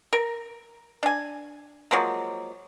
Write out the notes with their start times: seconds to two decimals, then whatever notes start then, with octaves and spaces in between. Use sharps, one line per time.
0.13 A#4
1.03 D4 G#5
1.91 F3 F#3 G#3 A#3